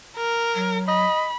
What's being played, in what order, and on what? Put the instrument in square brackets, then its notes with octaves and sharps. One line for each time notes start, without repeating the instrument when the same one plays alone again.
[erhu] A#4
[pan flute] F#3
[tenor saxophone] D#5 [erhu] B5